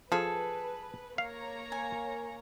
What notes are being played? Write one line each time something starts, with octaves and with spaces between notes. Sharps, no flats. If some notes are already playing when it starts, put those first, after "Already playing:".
F3 G#4 A4 B4
A#3 C#5 F5 A#5
G#5